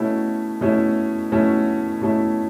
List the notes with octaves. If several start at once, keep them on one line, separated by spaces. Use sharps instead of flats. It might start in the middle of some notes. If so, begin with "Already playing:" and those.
Already playing: B2 A3 C#4 E4
B2 A3 C#4 E4
B2 A3 C#4 E4
B2 A3 C#4 E4